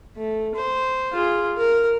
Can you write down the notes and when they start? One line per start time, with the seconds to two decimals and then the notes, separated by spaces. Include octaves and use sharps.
0.17 A3
0.55 C5
1.13 F4 G#4
1.57 A#4